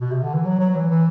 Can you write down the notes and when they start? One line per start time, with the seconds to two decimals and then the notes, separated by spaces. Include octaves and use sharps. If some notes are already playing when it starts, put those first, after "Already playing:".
0.01 B2
0.12 C3
0.23 D3
0.34 E3
0.45 F#3
0.59 F#3
0.70 F#3
0.75 E3
0.90 E3